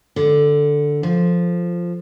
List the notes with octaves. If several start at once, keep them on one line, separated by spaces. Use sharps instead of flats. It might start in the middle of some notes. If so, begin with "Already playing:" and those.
D3
F3